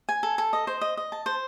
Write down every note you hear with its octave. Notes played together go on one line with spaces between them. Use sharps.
G#5
A4
A4
D#5
C5
D#5
D#5
A5
C5